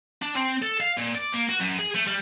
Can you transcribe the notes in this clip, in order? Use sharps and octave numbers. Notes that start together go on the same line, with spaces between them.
D4
C4
A4
F5
A#2
D5
A#3
F#4
F#2
G#4
A3
G3